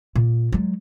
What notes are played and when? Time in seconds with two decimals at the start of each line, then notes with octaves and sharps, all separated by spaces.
0.16 A#2
0.52 F#3 G#3